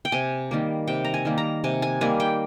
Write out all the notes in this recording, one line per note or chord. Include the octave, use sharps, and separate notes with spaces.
G5
C3 G#5
D#3 G3 A#3
C3 G5
A#5
G#5
D#3 G3 A#3
A#5
C3 G#5
G#5
D#3 G3 A#3 G#5
G5